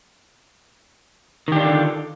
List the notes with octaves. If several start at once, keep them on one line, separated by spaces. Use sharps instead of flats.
D3 D#3 D4 F4 G4